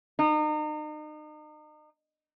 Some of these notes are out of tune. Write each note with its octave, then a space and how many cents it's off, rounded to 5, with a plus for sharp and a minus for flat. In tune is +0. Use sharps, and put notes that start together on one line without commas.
D#4 -35